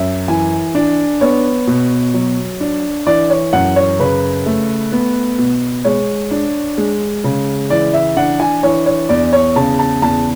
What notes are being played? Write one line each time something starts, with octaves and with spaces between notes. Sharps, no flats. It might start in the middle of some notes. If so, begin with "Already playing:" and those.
Already playing: F#2 E5
E3 G#5
D4
B3 C#5
B2
F#3
D4
E3 D5
C#5
F#2 F#5
C#5
C#3 B4
A3
B3
B2
G#3 C#5
D4
G#3
C#3
E3 D5
E5
D4 F#5
G#5
E3 C#5
C#5
E2 D5
C#5
C#3 A5
A5
E2 A5